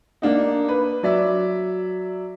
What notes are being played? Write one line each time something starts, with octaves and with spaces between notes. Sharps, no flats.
A#3 D4 D#4
B4
F#3 D5 E5